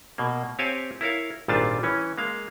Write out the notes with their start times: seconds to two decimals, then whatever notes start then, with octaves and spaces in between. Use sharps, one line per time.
0.18 B2 A#3
0.59 C4 G4 C#5 F5 G#5 A5
1.01 E4 A#4 C#5 F5
1.48 G#1 A#2 G3 D4 F4 A5
1.83 E3 C#4
2.18 G#3 A#3 F5